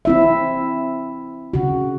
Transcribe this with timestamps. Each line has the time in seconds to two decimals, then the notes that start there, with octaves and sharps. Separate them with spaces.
0.05 C4 E4 E5
1.54 C#3 F#4